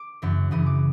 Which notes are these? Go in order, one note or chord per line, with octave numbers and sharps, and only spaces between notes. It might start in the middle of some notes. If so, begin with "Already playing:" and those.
Already playing: D6
F#2 C#3 E3
F#2 C#3 E3 D#6
D6